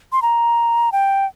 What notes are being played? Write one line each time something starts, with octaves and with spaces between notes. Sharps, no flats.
C6
A#5
G5